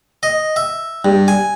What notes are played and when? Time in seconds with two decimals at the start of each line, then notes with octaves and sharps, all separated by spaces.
0.23 D#5
0.56 E5
1.05 G2
1.28 G#5